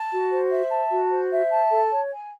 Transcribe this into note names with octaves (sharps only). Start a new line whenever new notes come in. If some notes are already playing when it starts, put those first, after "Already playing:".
Already playing: A5
F#4
C5
E5
A5
F#4
C5
E5
A5
A4
C#5
G#5